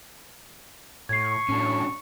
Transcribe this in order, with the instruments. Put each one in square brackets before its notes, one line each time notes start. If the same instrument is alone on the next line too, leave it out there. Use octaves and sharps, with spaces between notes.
[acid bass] A2 [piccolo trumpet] C#6 [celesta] G#6 C7
[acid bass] A2 [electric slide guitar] C#4 D4 F#4